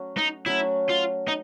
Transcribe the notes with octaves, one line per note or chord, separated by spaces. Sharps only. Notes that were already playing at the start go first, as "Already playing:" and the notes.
Already playing: F#3 A3 C#4 F#4
D#4
F#3 A3 C#4 E4 F#4
F4
D#4